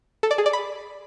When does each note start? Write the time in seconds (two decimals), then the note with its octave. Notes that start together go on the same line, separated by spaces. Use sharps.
0.23 A4
0.31 D5
0.38 G#4
0.46 D5
0.53 B5